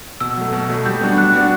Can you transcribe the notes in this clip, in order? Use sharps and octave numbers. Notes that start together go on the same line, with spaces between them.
B2 E6
F#3 A3
B2
F#3 A3
G3 G6
B3 D4 F#4
G3 F#6
B3 D4 F#4